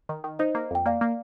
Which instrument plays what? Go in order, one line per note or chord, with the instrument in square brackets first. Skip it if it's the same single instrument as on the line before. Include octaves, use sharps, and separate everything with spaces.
[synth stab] D#3
D#3
[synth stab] D#4 [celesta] C5 D#5
[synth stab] A#3
[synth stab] F2 [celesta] G5
[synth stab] A#3 [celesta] D5 F5
[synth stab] A#3